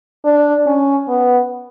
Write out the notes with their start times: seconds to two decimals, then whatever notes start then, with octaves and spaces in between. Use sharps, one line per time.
0.25 D4
0.66 C#4
1.08 B3